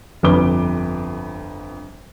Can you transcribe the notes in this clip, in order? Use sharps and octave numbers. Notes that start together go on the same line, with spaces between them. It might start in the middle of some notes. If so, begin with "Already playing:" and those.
G1 F2 D3 B4 D6 G7